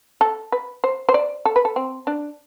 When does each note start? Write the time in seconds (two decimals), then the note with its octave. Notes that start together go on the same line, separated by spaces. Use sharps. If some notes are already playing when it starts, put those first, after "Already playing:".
0.21 A4
0.52 B4
0.84 C5
1.09 C5
1.14 D5
1.45 A4
1.56 B4
1.65 A4
1.76 C4
2.07 D4